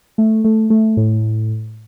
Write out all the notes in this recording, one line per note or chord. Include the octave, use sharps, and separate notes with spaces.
A3
A3
A3
A2